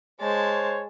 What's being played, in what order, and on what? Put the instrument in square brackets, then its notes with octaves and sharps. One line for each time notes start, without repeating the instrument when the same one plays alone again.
[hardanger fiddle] G#3 A5 [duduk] C5 [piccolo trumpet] C#5